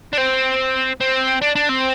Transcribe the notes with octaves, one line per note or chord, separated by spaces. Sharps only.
D4
C4
C4
D4
D4
C4